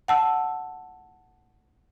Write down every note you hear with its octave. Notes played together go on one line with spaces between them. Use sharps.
F#5 A5 E6